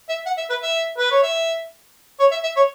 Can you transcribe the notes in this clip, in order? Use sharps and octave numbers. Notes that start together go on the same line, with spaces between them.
E5
F#5
E5
B4
E5
B4
C#5
E5
C#5
E5
E5
C#5